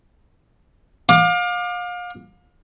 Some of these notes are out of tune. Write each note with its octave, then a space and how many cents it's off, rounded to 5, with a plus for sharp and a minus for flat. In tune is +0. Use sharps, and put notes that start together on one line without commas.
F5 +35 D6 +25